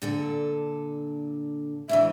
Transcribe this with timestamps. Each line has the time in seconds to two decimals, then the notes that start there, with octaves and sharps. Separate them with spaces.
0.02 A#2 D3 A4
1.89 D2 G#2 E3 E5